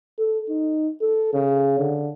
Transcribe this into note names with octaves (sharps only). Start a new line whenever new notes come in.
A4
D#4
A4
C#3
D3